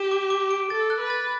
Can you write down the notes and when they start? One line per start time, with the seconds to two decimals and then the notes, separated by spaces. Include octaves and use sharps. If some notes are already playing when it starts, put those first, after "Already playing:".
Already playing: G4 E7
0.11 D6
0.30 D6
0.51 D7
0.70 A4 A6
0.90 F#6
1.00 B4
1.10 A6